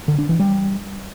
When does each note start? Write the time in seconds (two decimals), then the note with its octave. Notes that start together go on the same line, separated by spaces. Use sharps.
0.08 D3
0.18 D4
0.29 E3
0.39 G3